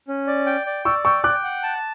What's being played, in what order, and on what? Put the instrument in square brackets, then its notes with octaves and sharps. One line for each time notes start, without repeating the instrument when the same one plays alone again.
[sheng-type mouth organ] C#4
D5
G5
D5
[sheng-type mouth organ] D5 [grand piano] C#6 E6
[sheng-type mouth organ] G5 [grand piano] C#6 E6
[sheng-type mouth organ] G5 [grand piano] D6 F#6
[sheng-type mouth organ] F#5
A5